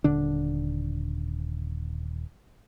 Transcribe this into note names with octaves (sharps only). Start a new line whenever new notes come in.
D#1 D3 D4